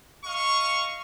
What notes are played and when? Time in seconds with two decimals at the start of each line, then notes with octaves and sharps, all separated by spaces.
0.24 D#5 F5 C#6